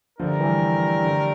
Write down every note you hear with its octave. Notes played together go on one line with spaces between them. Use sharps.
D3 F3 A3 D4 G4 A#4
E3 G3
D3 F3